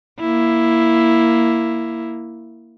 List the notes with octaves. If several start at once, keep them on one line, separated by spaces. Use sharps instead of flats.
A#3 E4